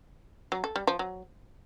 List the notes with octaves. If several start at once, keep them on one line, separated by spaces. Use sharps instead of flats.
F#3
A4
G3
F3
F#3